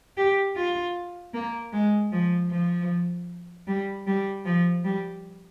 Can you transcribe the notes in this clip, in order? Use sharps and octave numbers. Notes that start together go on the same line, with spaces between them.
G4
F4
A#3
G#3
F3
F3
G3
G3
F3
G3